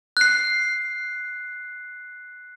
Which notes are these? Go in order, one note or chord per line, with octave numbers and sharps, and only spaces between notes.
F#6 C7